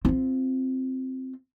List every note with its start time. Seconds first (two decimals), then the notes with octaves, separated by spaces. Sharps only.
0.05 C4 F4